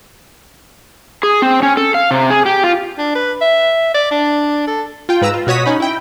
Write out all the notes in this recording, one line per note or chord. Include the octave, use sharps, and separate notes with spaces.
G#4
C4
C#4
A4
F5
C3
G#4
G4
F4
D4
B4
E5
D5
D4
A4
F4 G5
G#2 B4 A#5 E6
F4
B2 F#4 C#5 D#6 B6
C#4 D#4 B5
E4 G5